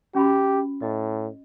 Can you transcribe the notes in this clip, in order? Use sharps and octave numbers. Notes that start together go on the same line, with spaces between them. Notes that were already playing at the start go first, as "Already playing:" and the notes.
C#4 F#4 G4 B5
A2 D#5